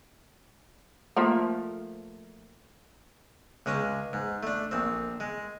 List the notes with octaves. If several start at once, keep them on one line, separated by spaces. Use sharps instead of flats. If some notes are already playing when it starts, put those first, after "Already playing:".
F3 A3 A#3
C#2 G#3 C#4 G5
G#2
A3 D4
A#1 C4
G#3